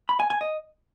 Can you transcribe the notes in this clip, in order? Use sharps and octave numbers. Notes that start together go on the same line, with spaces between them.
B5
G#5
G#5
D#5